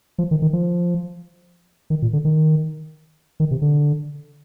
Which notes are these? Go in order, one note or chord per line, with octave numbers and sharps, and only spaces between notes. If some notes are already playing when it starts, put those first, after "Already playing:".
F3
D#3
D#3
F3
D#3
A#2
D3
D#3
D#3
C3
D3